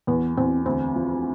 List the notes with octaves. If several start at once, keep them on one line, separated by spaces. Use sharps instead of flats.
E2 B3
E2 C4
D2 C4
F3